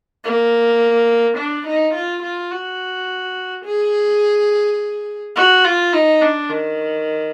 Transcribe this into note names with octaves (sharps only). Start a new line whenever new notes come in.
A#3
D4
D#4
F4
F4
F#4
G#4
F#4
F4
D#4
D4
D#3